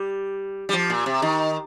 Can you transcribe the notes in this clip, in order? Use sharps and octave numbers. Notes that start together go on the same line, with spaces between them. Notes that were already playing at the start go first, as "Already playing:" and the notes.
Already playing: G3
G3
F3
A#2
C3
D#3